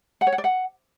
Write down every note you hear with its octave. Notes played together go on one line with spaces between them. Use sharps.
F#5
C#5
F#5
D5
F#5